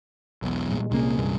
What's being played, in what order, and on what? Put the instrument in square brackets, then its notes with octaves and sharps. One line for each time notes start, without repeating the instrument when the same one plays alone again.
[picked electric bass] B1 E2
[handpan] A#2 G3 G#3
[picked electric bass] C2 A#3 [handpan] C3 C#4 G#4
[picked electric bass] C2 G2